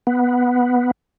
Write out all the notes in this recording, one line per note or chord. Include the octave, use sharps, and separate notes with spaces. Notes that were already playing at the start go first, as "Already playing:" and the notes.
B3